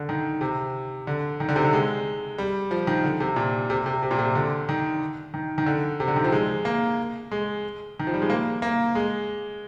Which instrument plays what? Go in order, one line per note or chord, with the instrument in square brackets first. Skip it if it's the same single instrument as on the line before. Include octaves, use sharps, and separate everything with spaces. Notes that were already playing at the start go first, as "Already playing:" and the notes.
Already playing: [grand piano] D3
D#3
C3
D3
D#3
D3
C3
D3
G#3
G3
F3
D#3
D3
C3
A#2
C3
C3
C3
A#2
C3
D3
D#3
D#3
D#3
D3
C3
D3
D#3
F3
G#3
A#3
G#3
D#3
F3
G3
G#3
A#3
A#3
G#3